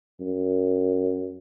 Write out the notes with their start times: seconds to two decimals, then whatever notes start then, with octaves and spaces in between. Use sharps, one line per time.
0.21 F#2